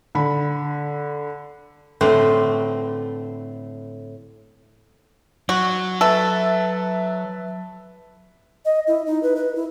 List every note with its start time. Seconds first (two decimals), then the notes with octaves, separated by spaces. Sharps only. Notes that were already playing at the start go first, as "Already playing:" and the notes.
0.15 D3 B5
2.01 A2 D3 A3 C4 B4 C5
5.49 F#3 F#4
6.01 A4 B4 E5 A5
8.65 D#5
8.87 E4
9.06 D#4
9.23 B4
9.36 B4
9.55 E4